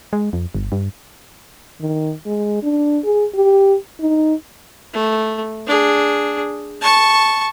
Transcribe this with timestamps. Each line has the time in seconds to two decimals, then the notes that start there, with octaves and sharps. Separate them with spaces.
0.13 G#3
0.33 F2
0.55 G1
0.72 G2
1.81 D#3
2.26 G#3
2.63 D4
3.04 G#4
3.34 G4
4.00 D#4
4.93 A3
5.67 D4 G#4
6.82 A5 C#6